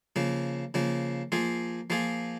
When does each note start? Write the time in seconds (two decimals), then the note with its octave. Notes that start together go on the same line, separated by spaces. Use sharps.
0.16 C#3 F3 A#3
0.74 C#3 F3 A#3
1.32 F3 A#3 F4 G#4
1.90 F3 A#3 F4 G#4